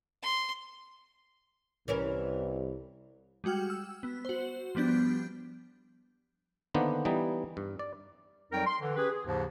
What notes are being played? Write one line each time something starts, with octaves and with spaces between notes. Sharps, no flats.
C6
C2 E3 C#4 A#4
G3 G#3 F#4 G5 F6
E6
B3
F#4 C5
F3 G3 B3 D4 G6
D3 D#3 A#3 B3 D4 C5
E3 G3 B3 D#4
G2
D5
F2 F#3 G3 D#4 A#4 G5
C6
D3 E3
C#4 G4 G#4 B4
G#4
D#2 G#2 C#3 F3